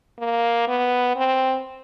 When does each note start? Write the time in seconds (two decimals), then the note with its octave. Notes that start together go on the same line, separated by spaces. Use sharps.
0.19 A#3
0.68 B3
1.16 C4